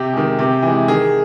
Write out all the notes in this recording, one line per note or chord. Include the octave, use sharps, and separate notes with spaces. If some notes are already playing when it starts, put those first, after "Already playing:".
Already playing: C3 G4
D#3 G#3
C3
E3 G#3
D#3 G#4